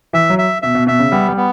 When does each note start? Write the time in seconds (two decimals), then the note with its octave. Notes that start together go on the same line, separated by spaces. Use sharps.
0.13 E3 E5
0.30 F#3
0.38 E5
0.62 B2 E5
0.75 B2
0.87 B2 E5
0.99 C#3
1.12 G3 B3
1.28 G3
1.37 B3